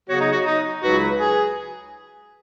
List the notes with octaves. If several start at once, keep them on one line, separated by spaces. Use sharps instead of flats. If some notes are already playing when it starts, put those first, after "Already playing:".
C#3 F#3 B3 F#4 G#4 C#5
D#4
F#4
D#4
C#2 C#3 F#3 D#4 F#4 B4
G#4